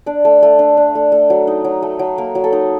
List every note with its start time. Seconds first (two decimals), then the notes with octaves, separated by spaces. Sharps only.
0.06 D4 D5
0.25 A3
0.43 A3
0.59 D4
0.77 D4
0.95 A3
1.12 A3
1.30 F#3
1.47 D#4
1.64 F#3
1.83 A3
1.99 F#3
2.18 A#3 A#4
2.35 F#3
2.44 A4
2.53 D#4